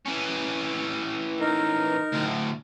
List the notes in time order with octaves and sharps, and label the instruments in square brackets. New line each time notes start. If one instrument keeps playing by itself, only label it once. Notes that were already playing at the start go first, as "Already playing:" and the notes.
[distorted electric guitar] E3 C#4
[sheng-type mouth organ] D#4 A#4
[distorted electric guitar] D2 A2